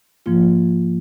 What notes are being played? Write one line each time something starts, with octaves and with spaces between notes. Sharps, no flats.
G#2 F3 A#3 F4